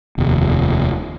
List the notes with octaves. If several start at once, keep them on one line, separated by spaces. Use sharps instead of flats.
F1 D#2